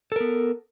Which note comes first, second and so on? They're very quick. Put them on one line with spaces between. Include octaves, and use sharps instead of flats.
A4 A#4 B3